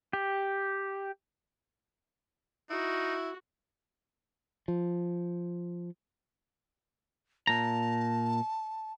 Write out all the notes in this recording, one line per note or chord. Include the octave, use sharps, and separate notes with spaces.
G4
D#4 E4 F#4
F3
A#2 A5 A#5